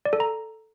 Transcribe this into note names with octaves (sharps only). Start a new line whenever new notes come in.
D5
A4
A#5